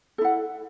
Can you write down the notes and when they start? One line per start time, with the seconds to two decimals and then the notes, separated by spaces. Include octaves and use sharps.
0.18 A4
0.21 E4
0.25 F#5